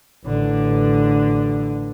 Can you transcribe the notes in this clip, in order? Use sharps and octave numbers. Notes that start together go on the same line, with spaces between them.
A1 D3